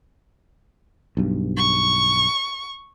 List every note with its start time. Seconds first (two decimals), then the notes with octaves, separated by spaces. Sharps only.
1.17 B1 G2
1.57 C#6